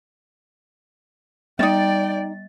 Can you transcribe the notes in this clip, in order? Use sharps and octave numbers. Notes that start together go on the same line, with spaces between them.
G3 C#4 D#4 D5 G5 A6